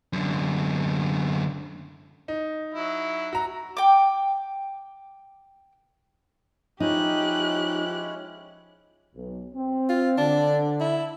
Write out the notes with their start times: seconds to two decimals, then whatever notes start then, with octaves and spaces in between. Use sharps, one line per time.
0.13 F#2 D3
2.28 D#4
2.74 F#3 E4
3.33 F#4 A#5
3.77 G5 D6
6.80 F3 G#3 C#4 D#4 E4 G4 F#6
9.15 B1
9.55 C4
9.89 F4
10.18 D3 D4
10.81 E4